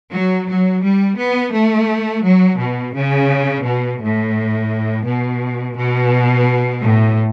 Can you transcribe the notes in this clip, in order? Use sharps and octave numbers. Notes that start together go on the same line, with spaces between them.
F#3
F#3
G3
B3
A3
F#3
B2
C#3
B2
A2
B2
B2
A2